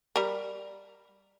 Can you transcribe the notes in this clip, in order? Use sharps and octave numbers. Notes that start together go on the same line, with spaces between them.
G3 A#4